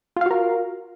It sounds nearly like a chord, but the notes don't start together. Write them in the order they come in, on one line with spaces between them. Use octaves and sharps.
F4 F5 F#4 A#4